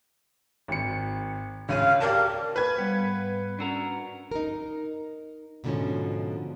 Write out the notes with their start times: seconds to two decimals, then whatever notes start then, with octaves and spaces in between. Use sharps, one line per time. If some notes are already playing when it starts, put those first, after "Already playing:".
0.68 G#1 C#7
1.69 C#2 C#4 F5 D#7
2.00 G4 A#4 D5 A5
2.56 B4 C5 G#6
2.78 G3 B3 F5
2.99 G#2
3.59 C#4 D4 F#4 A#4 E6
4.31 D#4 A#4
5.64 G#2 B2 D3 D#3 F3 C#4